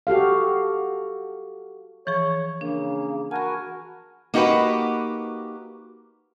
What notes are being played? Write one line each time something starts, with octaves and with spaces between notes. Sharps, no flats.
F#4 G4 A4 F5
E3 F3 G#4 C#5
C#3 A#3 D4
F#4 A#4 G#5 A5 B5
A#3 D#4 F#4 G4 B4